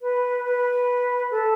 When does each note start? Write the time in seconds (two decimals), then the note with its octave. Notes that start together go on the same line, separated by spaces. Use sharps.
0.01 B4
0.45 B4
1.30 A4